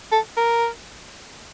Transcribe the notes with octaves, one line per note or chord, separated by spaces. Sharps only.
A4
A#4